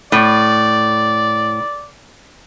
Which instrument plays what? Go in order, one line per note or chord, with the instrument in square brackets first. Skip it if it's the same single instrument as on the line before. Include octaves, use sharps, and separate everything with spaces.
[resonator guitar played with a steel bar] A2 [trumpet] D5